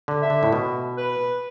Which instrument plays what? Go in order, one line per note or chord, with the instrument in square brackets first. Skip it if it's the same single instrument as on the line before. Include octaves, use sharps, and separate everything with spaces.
[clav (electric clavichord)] D3
[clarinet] E5
[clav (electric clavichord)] D3
A2
B2
[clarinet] B4